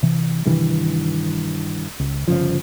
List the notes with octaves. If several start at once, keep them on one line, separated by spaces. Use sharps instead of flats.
C3 E3
G2 C3 D#3 E3
C#2
G1 D2 C#3 F3